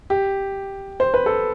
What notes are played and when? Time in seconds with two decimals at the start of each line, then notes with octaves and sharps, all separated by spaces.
0.10 G4
1.00 C5
1.14 B4
1.26 A4